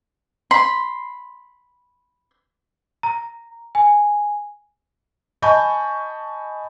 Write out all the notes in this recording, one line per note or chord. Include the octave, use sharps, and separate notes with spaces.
B5 C6
A#5
G#5
D#5 G#5 A5 B5 C#6 G6